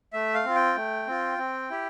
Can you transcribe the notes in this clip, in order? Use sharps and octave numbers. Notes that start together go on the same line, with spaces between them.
A3 E5
F5
C4 F4
G5
A3
C4 F4
C4
E4 G4